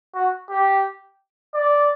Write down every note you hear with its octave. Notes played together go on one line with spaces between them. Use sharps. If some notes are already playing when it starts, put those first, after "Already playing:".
F#4
G4
D5